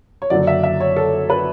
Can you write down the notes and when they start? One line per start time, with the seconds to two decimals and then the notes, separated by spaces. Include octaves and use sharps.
0.22 C#5
0.30 F#1 F#2 D3 F#3 D5
0.47 E5
0.63 E5
0.81 C#5
0.96 A4
1.30 B4